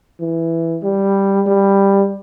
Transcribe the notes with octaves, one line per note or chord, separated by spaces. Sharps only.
E3
G3
G3